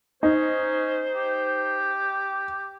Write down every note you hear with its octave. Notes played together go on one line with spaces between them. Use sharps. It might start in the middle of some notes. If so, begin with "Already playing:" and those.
C#4 D#4 C5
G4